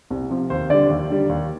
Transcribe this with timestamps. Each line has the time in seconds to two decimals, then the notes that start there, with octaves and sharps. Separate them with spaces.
0.10 C2
0.30 C3 F3
0.50 D#2 C5
0.70 D3 G3 D5
0.90 D#2
1.10 D3 G3
1.29 D#2